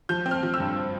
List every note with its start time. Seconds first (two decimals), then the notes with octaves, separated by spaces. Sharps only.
0.09 F3 G6
0.26 C4
0.31 F6
0.43 F3
0.54 E6
0.60 G2